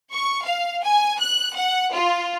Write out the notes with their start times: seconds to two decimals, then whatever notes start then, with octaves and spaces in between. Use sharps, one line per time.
0.13 C#6
0.44 F5
0.83 G#5
1.20 F#6
1.56 F#5
1.93 F4